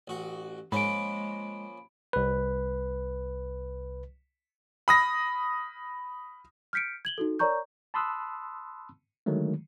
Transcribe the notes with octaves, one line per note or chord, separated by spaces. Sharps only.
A1 F#4
G#2 F3 G#3 A#3 C#4 B5 D7
C2 B4
B5 D#6 A#6
F6 G6 B6 C#7 D7
G#6 F#7 G7
D#4 F#4 A4
A#4 C#5 D5 A#5 C#6 G6
A5 B5 C6 D#6 E6 F#6
D3 D#3 F#3 G#3 A3